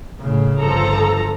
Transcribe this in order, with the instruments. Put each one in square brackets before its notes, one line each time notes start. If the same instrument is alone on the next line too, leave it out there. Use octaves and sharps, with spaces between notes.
[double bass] A2 C#3
[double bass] G1 [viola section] F3 A4 A#5